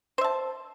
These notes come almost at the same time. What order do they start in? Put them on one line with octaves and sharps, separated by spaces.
C5 E5 A5